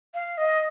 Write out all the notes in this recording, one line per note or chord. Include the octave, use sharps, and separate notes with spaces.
F5
D#5